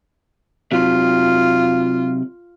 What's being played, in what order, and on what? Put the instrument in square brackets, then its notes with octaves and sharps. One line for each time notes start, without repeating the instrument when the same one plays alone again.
[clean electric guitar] C3 F#3 [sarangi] F4